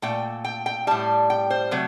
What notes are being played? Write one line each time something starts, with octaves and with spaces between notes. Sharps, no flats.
A#2 A3 G5
G5
G5
A2 G3 A5
G5
C5
C3 F#3 A3